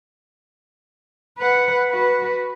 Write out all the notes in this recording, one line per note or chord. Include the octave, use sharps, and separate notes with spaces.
B4 F#5
F#4 B4